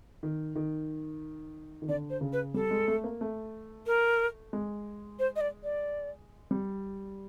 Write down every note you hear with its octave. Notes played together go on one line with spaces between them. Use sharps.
D#3
D#3
D#3
D3 D5
C5
C#3
B4
G3 A4
G#3
A3
A#3
A3
A#4
G#3
C5
D#5
D5
D5
G3